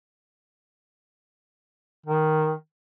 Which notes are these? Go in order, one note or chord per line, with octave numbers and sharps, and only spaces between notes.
D#3